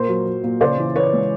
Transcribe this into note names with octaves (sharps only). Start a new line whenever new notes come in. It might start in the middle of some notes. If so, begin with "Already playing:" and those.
Already playing: A#2 A#4 C5
F#3
F#3
A#2
C#3 C5 D5
E3
E3 B4 C#5
G#3